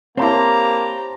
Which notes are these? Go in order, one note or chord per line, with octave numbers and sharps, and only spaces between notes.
A#3 C4 E4 G4 C#5 A5 A#5 C6